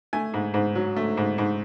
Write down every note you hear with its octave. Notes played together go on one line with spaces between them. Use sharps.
A3 G#5
G#2
G#2
F#3
A3
G#2
G#2